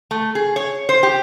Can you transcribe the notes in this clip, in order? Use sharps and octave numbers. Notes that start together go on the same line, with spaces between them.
A3
G#4
C#5
C5
G4